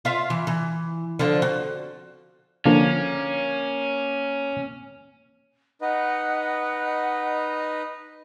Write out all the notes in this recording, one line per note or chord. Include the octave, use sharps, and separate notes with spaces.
F4 E5
E3
E3
D3 F3
F#4
D3 F3 A#3 C#4
D#4 B4 D#5 F#5